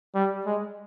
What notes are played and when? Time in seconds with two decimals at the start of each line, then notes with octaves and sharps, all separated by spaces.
0.15 G3
0.46 G#3